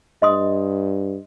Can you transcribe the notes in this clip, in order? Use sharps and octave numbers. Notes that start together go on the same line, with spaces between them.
G2 D#5 C6 D#6